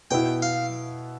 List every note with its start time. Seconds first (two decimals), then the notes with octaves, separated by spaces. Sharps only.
0.11 B2 B3 E4 G5
0.42 F5